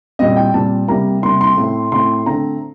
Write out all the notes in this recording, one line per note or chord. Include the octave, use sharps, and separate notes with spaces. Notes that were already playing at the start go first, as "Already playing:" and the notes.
A#2 G3 C4 D#5
G5
A#2 G3 C4 A5
C3 G3 A#3 A#5
C3 G3 A#3 C6
C6
A2 A3 C4
A2 A3 C4 C6
D3 A3 C4 A#5